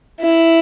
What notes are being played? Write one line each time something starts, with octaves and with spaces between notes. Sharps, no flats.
E4